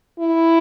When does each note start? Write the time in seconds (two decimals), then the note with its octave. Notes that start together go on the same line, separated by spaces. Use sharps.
0.20 E4